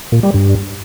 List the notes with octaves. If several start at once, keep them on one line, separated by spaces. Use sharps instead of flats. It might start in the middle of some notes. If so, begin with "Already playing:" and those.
A#2
G3
G2